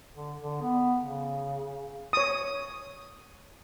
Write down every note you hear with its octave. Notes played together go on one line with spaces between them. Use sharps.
D3
D3
B3
C#3
C#5 D#6